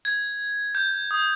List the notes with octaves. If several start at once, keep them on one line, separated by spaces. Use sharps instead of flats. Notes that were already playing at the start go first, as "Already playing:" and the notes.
G#6
G6
D#6